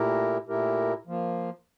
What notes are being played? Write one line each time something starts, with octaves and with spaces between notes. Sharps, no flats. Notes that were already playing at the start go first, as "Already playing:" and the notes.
Already playing: A#2 A3 E4 G4 A#4
A#2 A3 E4 G4 A#4
F3 A#3